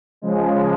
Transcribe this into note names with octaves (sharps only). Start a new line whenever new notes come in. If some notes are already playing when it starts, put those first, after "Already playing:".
C#3 F3 G#3